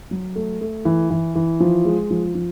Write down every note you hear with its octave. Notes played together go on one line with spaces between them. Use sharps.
F#3
A3
A3
E3
E3
E3
F3
G#3
F3
F3